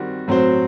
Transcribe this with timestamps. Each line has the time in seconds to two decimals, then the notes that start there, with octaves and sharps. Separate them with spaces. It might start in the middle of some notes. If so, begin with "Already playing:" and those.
Already playing: D#3 G3 C4 F#4
0.28 A2 F#3 C4 F#4 C5